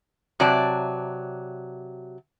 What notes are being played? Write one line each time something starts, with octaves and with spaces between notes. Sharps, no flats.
C3 F#3 D5 A5